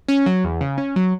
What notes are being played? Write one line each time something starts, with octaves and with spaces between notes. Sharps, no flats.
C#4
F#3
E2
C#3
C#4
F#3